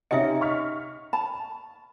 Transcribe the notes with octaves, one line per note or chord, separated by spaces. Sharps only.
C3 C#4 D#4 D#5 E5 F#5 C#7
C#6 F6 B6
A5 B5